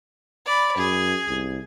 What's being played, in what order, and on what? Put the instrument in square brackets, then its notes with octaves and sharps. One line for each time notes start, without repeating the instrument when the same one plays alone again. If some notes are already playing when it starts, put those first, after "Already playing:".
[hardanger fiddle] D5 B5
[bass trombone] F#2 [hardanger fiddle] G#4
[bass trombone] C2